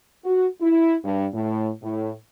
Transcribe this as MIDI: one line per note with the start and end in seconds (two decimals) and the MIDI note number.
0.25 0.47 66
0.61 0.96 64
1.04 1.25 43
1.34 1.70 45
1.83 2.11 45